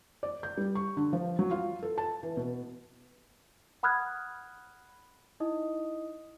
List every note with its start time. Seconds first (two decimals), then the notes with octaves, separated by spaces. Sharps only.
0.23 D5
0.43 G6
0.57 G3
0.75 C#6
0.97 D3
1.13 F3
1.39 F#3
1.51 F4
1.83 A4
1.98 A5
2.23 E3
2.37 B2
3.83 F#5 B5 D#6 F6 F#6 G#6
5.40 D#4 E4 D#5 D#6